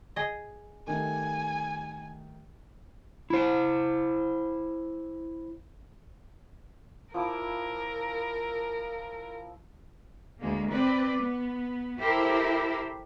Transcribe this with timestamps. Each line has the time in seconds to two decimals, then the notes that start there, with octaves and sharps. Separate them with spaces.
0.16 G#4 D#5
0.87 D#3 G3 A3 G#5
3.30 E4 C5
7.14 F3 E4 A#4 D6
10.39 D2 G#3 A#3
10.71 C4 B4 D5
11.18 B3
11.99 E4 G4 A4 A#4 C5